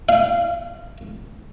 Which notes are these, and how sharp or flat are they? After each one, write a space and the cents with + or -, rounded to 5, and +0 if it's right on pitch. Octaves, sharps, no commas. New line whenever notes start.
F5 -20